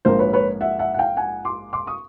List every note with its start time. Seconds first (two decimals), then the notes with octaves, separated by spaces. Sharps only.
0.05 A#1 G#2 F3 A#3 A#4 C5
0.19 B4 C#5
0.33 B4 C#5
0.61 E5 F#5
0.79 E5 F#5
0.94 F#5
0.98 F5 G5
1.17 F#5 G#5
1.45 C6 D6
1.73 C6 D6
1.87 C#6 D#6